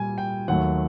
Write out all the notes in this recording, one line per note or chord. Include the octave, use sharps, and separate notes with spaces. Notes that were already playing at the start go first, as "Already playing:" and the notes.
Already playing: A#2 G3 G#5
G5
D#2 D#3 F#3 A3 F#5